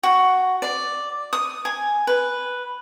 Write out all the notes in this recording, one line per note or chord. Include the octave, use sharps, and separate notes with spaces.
F#4
D5
D#6
G#5
B4